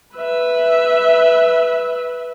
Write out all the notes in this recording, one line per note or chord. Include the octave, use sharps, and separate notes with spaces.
B4 E5